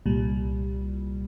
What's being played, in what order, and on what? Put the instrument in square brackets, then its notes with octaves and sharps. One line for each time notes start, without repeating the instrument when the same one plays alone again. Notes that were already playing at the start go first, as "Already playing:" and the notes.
[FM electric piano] C2 A#2 G3